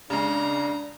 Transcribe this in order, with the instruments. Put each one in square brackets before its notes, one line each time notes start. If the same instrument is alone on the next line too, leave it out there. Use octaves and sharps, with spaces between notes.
[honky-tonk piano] C#3 G#3 [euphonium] D4 [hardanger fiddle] A#5